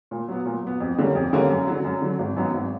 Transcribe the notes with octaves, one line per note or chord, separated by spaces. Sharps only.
A#2
F#3 B3
A#2
F#3 B3
F2
D3 G3 A#3 C#4
F2
D3 G3 A#3 C#4
F#2
D3 F#3
F#2
D3 F#3
G#1
F#2 D#3 F#3 B3
G#1